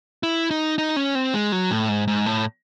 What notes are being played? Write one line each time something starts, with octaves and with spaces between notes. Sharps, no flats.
E4
D#4
D#4
C#4
C4
G#3
F#3
A2
G#2
G#2
A2